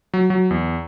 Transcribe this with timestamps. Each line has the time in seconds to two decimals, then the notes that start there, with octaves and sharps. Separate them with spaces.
0.14 F#3
0.30 F#3
0.51 E2